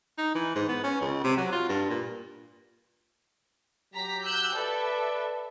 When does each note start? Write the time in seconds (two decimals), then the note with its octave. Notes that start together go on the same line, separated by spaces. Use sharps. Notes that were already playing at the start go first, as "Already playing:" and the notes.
0.18 D#4
0.35 E3
0.55 G#2
0.69 B3
0.84 C#4
1.01 C#2
1.24 C3
1.37 F#3
1.52 F4
1.69 G2
1.90 A#2
3.94 F#3 G4 A#5 B6
4.25 E6 F#6 G6
4.55 A4 B4 D5 E5